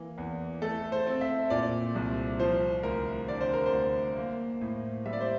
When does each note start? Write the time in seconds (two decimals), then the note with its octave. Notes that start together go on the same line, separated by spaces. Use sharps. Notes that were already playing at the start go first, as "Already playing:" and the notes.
Already playing: E3 A#3
0.18 E2
0.62 A3 A4
0.92 C5
1.07 C4
1.21 E5
1.50 A#2 D5
1.95 C2
2.40 F3 C5
2.83 D2 A#4
3.28 D3 D5
3.41 C5
3.53 A#4
3.66 C5
3.72 D2
4.16 A#3
4.61 A2
5.06 G3 E5
5.13 D5
5.21 C5